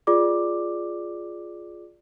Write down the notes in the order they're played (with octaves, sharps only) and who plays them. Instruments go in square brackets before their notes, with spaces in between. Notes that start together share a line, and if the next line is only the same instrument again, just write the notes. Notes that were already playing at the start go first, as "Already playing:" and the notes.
[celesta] F4 G#4 D5 D6